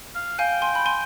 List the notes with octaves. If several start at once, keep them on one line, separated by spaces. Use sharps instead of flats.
F5
F5 G5 G#5
G#5 C6
B5
G#5 C6